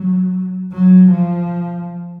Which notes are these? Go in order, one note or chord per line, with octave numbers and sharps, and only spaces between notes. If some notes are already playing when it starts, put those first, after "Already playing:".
Already playing: F#3
F#3
F3